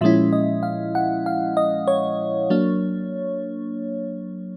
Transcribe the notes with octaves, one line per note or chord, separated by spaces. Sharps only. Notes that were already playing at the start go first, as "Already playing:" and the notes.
A#2 F3 G#3 C#4 E4 E5
D#5
F5
F#5
F5
D#5
C#5
F#3 A#3 D4